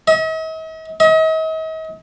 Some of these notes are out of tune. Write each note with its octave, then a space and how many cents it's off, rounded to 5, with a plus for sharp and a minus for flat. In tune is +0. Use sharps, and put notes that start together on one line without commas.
D#5 +45
D#5 +40